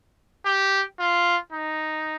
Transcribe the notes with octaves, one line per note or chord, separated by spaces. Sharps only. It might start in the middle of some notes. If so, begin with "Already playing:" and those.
G4
F4
D#4